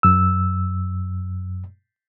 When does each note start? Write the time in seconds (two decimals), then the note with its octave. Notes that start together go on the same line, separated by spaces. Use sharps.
0.03 F#2 E6